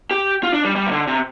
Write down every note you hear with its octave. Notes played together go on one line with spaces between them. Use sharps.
G4
F4
D4
G3
G3
C3
D3
C3